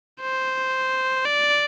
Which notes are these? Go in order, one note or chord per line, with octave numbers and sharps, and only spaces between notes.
C5
D5